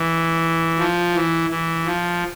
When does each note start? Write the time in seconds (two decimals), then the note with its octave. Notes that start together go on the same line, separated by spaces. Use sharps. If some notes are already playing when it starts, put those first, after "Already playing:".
Already playing: E3
0.78 F3
1.15 E3
1.50 E3
1.86 F3